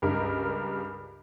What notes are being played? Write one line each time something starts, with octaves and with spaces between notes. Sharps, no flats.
C#2 G2 A#4